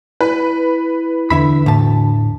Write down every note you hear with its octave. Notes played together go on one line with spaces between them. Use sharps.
E4 B4
E2 D3 E4 E5 B5
D2 A2 A5